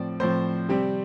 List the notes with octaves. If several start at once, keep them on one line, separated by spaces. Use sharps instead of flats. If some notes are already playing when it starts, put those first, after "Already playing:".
Already playing: A2 F3 C4 D5
A2 F3 C4 C5
C3 G3 C4